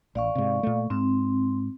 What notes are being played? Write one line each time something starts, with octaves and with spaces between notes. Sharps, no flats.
A1 D5 F5 C#6
G#2 C3
A#2 A3
G#2 C4